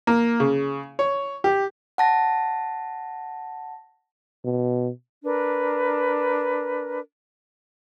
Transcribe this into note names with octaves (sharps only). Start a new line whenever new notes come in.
A#3
C#3
C#5
G4
F#5 A5 A#6
B2
D4 A#4 B4